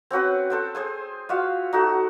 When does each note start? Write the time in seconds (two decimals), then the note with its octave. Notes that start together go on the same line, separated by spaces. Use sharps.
0.11 C4 C#4 F#4 B4
0.50 A4 C5 G5
0.75 G#4 C5 G#5
1.29 F4 F#4 E5 F5
1.73 D#4 F#4 A4